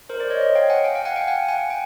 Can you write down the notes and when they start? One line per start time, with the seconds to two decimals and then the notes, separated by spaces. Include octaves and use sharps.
0.09 A#4 C5
0.20 C5 D5
0.30 C#5 D#5
0.41 C#5 D#5
0.55 F5 G5
0.70 F#5 G#5
0.84 F5 G5
0.95 F5 G5
1.05 F#5 G#5
1.16 F5 G5
1.27 F#5 G#5
1.49 F#5 G#5
1.70 G5